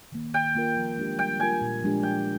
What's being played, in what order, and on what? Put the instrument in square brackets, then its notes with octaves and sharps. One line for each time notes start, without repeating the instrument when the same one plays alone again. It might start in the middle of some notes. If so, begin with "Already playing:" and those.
[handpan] D#3 A#3
[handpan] D#3 [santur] G5
[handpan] A#3 F4 A#4
F3
G#3 D4 G4
[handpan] G3 [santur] G5
[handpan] A#3 F4 A#4 [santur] G#5
[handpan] A#2
F3 G#3 D4 G4
[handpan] F3 [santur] G5